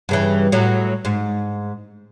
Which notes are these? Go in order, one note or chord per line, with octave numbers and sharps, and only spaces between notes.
G2 C#3 E3
A2 F#3
G#2